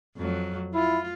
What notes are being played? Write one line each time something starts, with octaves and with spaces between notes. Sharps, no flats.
F2 F#3
E4 F4